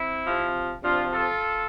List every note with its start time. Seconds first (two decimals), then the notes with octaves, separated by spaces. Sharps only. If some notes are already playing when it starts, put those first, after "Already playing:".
Already playing: C4 E4
0.26 C3 F3
0.83 C3 F3 D4 F4
1.13 F4 A4